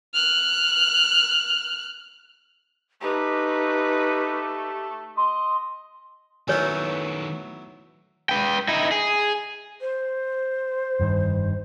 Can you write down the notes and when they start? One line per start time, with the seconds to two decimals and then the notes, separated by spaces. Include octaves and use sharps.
0.14 F6 F#6
3.01 A3 D#4 G4 B4
5.17 D#5 C6
6.48 D#3 F#3 A3 B3 E4 B4 C#5 G#5
8.29 B4 G5
8.68 D#4 E4
8.91 G#4
9.81 C5
10.99 F1 G2 D#3